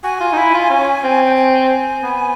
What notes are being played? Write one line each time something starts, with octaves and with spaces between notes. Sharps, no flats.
F#4 G#5
F4
D#4
E4
F4
C#4
C4
G5
G#5
B3